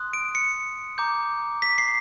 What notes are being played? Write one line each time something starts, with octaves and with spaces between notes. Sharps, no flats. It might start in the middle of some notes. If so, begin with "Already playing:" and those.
Already playing: C6 D#6 F#6
D7
C#7
A#5 D6 G6
B6
C7